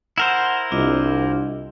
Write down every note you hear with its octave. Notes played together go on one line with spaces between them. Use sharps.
E4 A#4 C5 F#5
C2 D4 F4 D#5